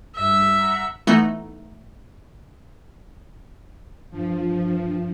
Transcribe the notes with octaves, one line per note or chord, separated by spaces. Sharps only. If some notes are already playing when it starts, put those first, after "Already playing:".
G2 E5
F#5 A#5
E3 A3 B3 D#4
G2 F3